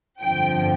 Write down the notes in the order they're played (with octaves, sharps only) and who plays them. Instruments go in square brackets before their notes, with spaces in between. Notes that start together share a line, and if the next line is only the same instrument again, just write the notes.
[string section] G1 F2 D3 F3 G5